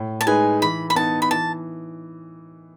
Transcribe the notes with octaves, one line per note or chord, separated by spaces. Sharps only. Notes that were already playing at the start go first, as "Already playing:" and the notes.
Already playing: A2
A5
G#3 D#4 G#4 B4 G#5
E3 B5
B5
B3 D#4 A5
B5
E3 A5